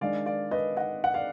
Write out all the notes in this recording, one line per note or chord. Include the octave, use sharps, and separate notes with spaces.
D#3 G#3 D4 D5 F5
D5 F5
B4 D#5
D#5 F#5
F#5
D5 F5